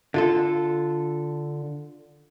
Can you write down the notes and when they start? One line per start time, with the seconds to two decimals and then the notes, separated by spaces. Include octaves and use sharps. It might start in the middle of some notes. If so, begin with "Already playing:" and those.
0.14 D3 F4 A4